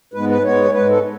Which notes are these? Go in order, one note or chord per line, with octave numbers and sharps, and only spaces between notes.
G#2 G#3 B3 B4
B4
G#2 G#3 B3 C#5
G#2 G#3 B3 B4
A4